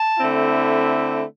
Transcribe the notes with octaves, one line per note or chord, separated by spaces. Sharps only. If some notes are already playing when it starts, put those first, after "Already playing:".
Already playing: A5
D3 A3 C4 E4